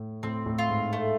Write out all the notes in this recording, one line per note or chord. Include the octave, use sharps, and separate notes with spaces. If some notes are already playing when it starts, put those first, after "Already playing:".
Already playing: A2
A2 C4
A2
F4
G#2
A3